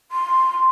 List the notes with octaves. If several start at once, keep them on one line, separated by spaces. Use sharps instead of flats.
C6